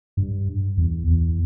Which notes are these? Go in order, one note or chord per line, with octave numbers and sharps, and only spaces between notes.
G2
E2
E2